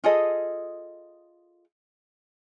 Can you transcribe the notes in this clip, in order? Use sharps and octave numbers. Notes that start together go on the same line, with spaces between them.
F4 G#4 A4 D#5